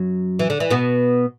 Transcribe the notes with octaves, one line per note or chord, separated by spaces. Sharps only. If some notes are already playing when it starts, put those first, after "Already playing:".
Already playing: F#2 F#3
E3
D3
E3
B2 B3